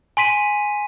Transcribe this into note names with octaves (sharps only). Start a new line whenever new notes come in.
G#5 C6 B6 D#7